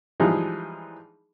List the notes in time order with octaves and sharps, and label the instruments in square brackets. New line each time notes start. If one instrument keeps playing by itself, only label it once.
[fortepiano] E3 F3 G3 G#3 D#4 G#4